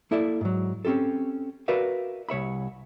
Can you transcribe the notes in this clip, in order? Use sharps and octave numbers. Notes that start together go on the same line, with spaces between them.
A#3 E4 A4 D5 E5
G#2 F#3
C4 C#4 F4 G4 A4
F#4 A#4 B4 D5 E5 F5
C2 C#5 E5 B5